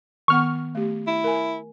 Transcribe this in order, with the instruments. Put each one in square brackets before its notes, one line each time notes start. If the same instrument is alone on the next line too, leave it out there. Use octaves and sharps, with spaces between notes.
[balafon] D#3 B3 F#5 [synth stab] C#6 F6
[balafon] A3 G4
[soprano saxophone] E4
[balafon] A#4 G#5